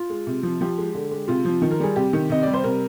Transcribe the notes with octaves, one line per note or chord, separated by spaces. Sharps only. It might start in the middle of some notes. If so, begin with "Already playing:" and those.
Already playing: F4
G#3
C3
F3
F3 G4
G#3
D3
G#3
C3 F4
F3
D#3
A#4
G3 G#4
C3 G4
D#3
C3 D#5
G3 D5
C5
C3 A#4